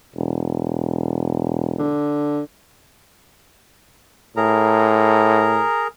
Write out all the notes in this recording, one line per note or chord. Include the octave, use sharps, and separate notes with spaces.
E1
D3
A2 G#4 A#4 A#5